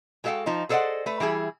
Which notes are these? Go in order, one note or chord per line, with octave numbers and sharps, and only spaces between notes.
G#3 F#4 A4 D#5 F5 G5
F3 D#4 F4
G#4 A4 C5 D5 D#5 F#5
A3 B4
E3 G3 E4 G#4